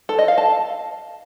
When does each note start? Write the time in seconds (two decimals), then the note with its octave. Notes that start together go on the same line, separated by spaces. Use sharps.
0.09 A4
0.19 D#5
0.28 F5
0.38 A5